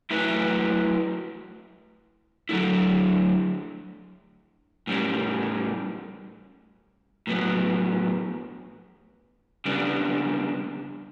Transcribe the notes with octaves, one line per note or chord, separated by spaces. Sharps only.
F#3 A3 E4 B4 E5
D3 F#3 A3 E4
A2 G3 C#4
A2 F#3 B3
C#3 G3 B3 D4